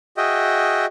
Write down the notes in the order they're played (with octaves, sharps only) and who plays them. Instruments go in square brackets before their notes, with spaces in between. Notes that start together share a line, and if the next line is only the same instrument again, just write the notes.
[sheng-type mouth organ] F#4 G#4 D#5 E5 G5